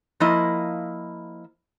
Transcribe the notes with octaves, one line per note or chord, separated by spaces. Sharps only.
F3 A#3 E4 D#5